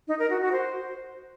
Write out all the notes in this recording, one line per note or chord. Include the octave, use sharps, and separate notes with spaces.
D#4
A#4
F#4
F#4
C5